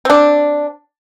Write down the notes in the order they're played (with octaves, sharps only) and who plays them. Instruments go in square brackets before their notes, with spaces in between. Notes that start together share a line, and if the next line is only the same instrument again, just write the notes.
[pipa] C4 D4